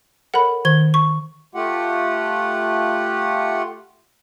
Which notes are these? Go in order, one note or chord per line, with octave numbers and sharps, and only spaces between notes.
A4 A#4 C#5 F#5 B5
D#3 G#6 G7
C#6
A3 F4 G4 F#5